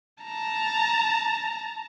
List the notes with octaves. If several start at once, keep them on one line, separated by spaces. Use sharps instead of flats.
A5 A#5